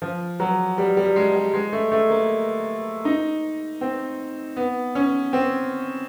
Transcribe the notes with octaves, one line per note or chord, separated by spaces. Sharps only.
F3
F#3
G3
G3
G#3
G3
G#3
A3
A3
A#3
D#4
C4
B3
C#4
C4